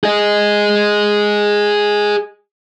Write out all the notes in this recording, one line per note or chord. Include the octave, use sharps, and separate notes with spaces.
G#4 D#5